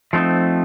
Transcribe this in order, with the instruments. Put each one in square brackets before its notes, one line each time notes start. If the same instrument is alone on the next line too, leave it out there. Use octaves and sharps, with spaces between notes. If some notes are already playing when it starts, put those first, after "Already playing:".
[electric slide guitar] F3 A3 C4 D#4